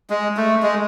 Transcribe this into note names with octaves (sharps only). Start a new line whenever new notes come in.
G#3
A3
G#3